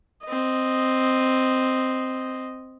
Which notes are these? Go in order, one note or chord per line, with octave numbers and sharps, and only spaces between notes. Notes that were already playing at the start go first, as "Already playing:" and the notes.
C4 D#5